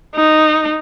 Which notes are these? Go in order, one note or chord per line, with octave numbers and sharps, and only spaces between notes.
D#4